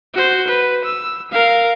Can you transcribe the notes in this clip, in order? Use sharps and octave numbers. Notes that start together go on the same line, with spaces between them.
F#4 C5
B4
E6
A#4 F5